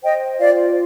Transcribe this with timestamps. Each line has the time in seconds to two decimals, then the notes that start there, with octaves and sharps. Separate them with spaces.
0.03 C5 D#5 G5
0.39 F4 D5 F5